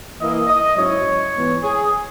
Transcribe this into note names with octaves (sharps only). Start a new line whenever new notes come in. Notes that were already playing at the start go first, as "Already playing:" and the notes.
E3 A#3 E4 D#5
D#5
G#2 F#3 C#4 E4 C#5
G#2 E3 B3
G#4